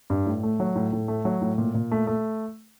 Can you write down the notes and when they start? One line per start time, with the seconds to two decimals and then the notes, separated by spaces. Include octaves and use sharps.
0.10 G2
0.26 A2
0.43 A3
0.60 F#3
0.76 A2
0.93 A2
1.08 A3
1.25 F#3
1.42 A2
1.58 A#2
1.74 A#2
1.91 A3
2.07 A3